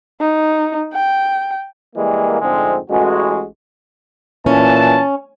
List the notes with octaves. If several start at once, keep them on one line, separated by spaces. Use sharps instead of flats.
D#4
G5
E3 G3 G#3 A#3
F2 G#2 D3 G#3 A3 C4
A1 G#3 F#4
A#2 E3 C#4 A5